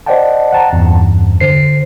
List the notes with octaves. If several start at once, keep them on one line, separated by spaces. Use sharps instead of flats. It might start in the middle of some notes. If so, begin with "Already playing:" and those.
C5 D5 D#5 F#5 G5 A5
F#5 A5 A#5
E2 G2
D3 C5 C7